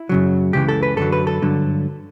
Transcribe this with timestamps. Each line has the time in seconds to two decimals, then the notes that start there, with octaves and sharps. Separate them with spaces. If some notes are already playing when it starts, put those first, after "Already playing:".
Already playing: E4
0.09 F#2 C#3 F#3
0.53 C#2 C#3 E3 G4
0.68 A4
0.83 B4
0.97 F#2 D3 F#3 A4
1.12 B4
1.27 A4
1.42 G2 D3 F#3